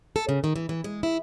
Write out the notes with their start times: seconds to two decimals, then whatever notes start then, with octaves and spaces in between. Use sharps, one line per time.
0.16 A4
0.29 C#3
0.44 D#3
0.56 E3
0.69 E3
0.84 G#3
1.03 E4